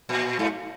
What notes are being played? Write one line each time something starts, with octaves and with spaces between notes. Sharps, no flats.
A#2
G#2